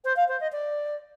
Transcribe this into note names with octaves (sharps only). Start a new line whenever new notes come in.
C5
F5
C5
D#5
D5